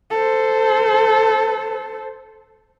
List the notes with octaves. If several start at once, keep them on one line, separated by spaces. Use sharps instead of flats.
A4 C5